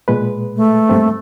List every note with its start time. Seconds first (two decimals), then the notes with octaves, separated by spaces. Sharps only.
0.08 A#2 G#3 B4
0.56 A3
0.89 G2 A#3 C4